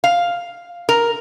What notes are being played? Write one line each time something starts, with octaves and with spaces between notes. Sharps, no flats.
F5
A#4